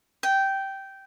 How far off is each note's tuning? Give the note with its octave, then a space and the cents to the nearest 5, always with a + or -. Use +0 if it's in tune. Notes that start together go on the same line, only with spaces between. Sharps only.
G5 -10